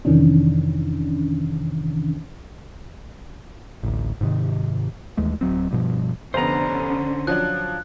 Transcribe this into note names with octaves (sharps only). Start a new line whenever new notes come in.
F2 C3 D#3 E3 C#4 D4
A1 D2
G#2 C3 D#3
D#2 E3 G#3 A3
D1 F#3 C4
G2 B2 F3
F1 D3 B3 C#4 C5 A#5
F3 F#3 D4 F#6